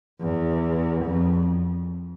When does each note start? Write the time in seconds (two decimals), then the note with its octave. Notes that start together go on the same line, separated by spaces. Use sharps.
0.21 E2
1.05 F2